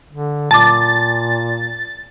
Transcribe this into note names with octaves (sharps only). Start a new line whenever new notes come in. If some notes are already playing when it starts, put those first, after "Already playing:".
D3
A#2 A5 D6 A6